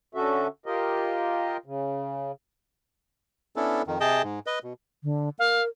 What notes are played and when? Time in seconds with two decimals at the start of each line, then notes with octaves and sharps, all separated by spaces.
0.15 D3 C#4 F#4 A4 E5
0.66 F4 G4 A#4 D#5
1.66 C#3
3.56 B3 C#4 D4 E4 A4
3.87 F2 D#3
4.00 C3 G#4 D#5 G5 A5
4.23 G#2
4.46 B4 D#5
4.63 B2
5.04 D3
5.39 A#4 F5